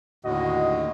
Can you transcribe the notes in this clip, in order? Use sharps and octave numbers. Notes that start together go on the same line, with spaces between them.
D#2 A2 D3 F#4 D#5